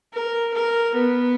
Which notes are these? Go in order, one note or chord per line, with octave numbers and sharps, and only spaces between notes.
A#4
A#4
B3